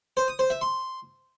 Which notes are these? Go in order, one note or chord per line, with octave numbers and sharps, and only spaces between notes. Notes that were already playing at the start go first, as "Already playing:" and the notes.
C5
D#6
C5
E5
C6